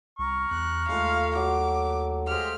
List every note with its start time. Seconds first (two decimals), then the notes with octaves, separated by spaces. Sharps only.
0.19 C2 A#5 C#6 F6
0.51 E2 F#6
0.89 D#2 G#3 A3 F4 F5
1.35 F#3 D6
2.27 G#3 G4 C5 F5 F6